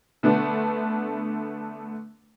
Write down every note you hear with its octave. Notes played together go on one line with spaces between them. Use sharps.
D3 A3 B3 D4